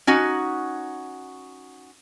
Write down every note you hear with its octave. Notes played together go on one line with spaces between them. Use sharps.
C#4 D#4 F#4